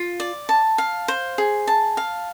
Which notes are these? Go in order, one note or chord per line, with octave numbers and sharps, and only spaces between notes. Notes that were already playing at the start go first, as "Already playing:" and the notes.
Already playing: F4
D5
A5
F5
C5
G#4
A5
F5